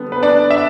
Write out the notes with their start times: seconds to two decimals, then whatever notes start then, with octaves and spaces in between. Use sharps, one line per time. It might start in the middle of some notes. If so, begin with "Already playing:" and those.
Already playing: D3 G3 B3 D4
0.12 B4
0.23 D4 D5
0.51 E5